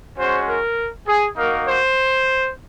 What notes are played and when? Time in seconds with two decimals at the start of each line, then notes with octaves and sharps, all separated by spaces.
0.17 G#3 C#4 F#4 C5
0.47 A#4
1.07 G#4
1.36 A#3 D#4 F#4 A#4
1.66 C5